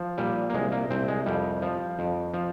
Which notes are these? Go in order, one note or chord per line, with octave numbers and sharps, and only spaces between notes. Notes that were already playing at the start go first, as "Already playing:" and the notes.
Already playing: F3
A#2 G3
A#3
C2 G#3
A#3
C2 C4
G#3
F2 G3
F3
F2
F3